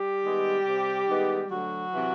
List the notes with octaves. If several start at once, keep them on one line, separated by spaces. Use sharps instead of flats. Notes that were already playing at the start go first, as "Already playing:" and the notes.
Already playing: G3 G4
D#3 G#3 B3
C3
D#3 G#3 B3
D2 F#3 F#4
C3 E3